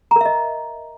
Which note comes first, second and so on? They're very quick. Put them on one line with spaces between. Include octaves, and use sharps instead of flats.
A#5 A#4 E5 D#5